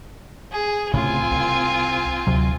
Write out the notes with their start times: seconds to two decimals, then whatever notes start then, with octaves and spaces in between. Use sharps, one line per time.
0.51 G#4
0.94 C2 A2 C#3 C4 F4 G#5
1.31 C2
2.27 D2 C3 F#3